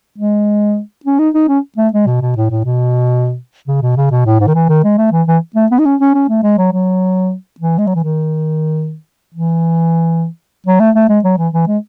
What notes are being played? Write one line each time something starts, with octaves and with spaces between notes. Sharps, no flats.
G#3
C#4
D#4
D#4
C#4
A3
G#3
B2
B2
A2
A2
B2
C#3
B2
C#3
B2
A2
G#2
D#3
E3
D#3
G#3
A3
E3
E3
A3
B3
D#4
C#4
C#4
C#4
A3
G#3
F#3
F#3
E3
G#3
F#3
E3
D#3
E3
F#3
A3
A3
G#3
F#3
E3
E3
G#3